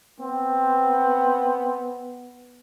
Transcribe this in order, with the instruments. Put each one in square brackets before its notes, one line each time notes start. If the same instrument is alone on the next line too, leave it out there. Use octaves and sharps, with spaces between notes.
[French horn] B3 [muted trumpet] C4